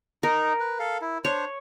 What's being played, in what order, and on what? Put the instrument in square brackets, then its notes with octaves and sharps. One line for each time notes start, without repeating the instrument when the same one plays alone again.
[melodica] D#4 [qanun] A#4
[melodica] B4
A4 F5
E4
[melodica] D4 C5 [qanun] C#5